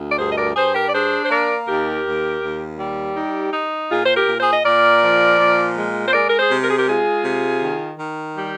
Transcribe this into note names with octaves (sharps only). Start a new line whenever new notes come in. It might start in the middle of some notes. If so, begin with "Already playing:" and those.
Already playing: D2
D5
G2 G#4 C5
D#5
A#4 D5
G2 G#4 C5
G4 A#4
D5
D4 G#4 C5
C5
A#3 A#4 D5
D#2 G4 A#4
D#2
D#2
G3
D#4 G4
D#4
A#2 F4 G#4
C5
G4 A#4
A#2
G#4 C5
D#5
A#2 A#4 D5
F3
A#2
G#3
C5
G#3 A#4 D5
A#4
G#4 C5
C3
A#4
G#4
G4 A#4
G#3 F4 G#4
C3
D#3
D#3
G3 G4